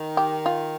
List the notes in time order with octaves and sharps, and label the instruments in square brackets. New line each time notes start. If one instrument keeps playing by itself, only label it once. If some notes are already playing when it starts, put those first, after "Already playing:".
Already playing: [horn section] D#3
[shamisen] G4
F4